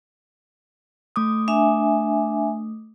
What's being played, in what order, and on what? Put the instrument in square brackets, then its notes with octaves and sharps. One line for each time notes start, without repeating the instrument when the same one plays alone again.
[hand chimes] A3 D6 D#6
[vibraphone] D4 E5 G#5